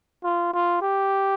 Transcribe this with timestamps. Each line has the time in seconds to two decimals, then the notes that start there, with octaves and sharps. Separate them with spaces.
0.24 F4
0.54 F4
0.82 G4